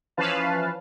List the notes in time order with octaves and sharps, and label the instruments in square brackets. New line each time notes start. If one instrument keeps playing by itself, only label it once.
[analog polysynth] E3 F3 C#4 B4 F5 A5